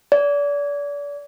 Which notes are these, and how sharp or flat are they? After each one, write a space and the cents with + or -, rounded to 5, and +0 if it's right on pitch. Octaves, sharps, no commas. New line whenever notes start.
D5 -35